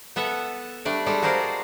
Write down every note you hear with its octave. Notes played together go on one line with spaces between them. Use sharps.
B3 A4 E5 F#5
G3 A3 D4 D5
G3 G#3 A4
F#4 G#4 A#4 C5 D5 F5